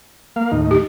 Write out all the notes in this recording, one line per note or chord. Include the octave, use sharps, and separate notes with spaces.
A#3 F5
D#2 A2 D#4
G4